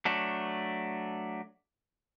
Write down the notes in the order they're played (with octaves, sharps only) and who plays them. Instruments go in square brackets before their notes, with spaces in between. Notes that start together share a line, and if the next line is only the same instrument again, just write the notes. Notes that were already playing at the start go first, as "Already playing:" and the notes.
[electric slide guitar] F#3 A3 D4